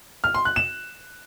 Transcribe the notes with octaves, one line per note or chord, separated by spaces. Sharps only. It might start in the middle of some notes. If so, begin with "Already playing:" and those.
F6
C6
F#6
E7